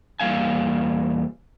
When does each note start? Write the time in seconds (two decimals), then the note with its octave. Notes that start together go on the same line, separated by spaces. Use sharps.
0.20 E2 G3 A#3 F5 G#5